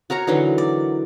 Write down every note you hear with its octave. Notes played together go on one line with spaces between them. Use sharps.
F#4 A#4 C#5 A#5
D3 E3 F#3 D#4
D5